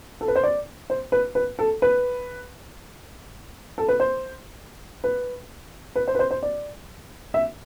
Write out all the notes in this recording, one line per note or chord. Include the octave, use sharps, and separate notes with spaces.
A4
B4
C5
D5
C5
B4
B4
A4
B4
A4
B4
C5
B4
B4
C5
B4
C5
C5
D5
E5